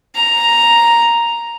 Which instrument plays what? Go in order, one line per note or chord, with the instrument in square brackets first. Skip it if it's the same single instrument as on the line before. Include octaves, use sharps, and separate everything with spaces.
[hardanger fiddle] A#5